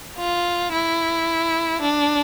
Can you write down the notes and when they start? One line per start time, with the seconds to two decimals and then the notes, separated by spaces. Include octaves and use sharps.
0.19 F4
0.72 E4
1.82 D4